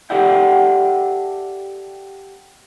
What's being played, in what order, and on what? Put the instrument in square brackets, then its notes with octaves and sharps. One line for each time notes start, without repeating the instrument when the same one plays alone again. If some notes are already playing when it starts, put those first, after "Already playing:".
[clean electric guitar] G4 A4 D5 E5 F#5 G5